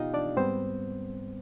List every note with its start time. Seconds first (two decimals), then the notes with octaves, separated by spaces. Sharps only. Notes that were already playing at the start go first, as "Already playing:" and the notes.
Already playing: B2 B3 D#4 F4 G4 D#5 F5 G5
0.14 D4 D5
0.37 G#2 G3 B3 C4 C5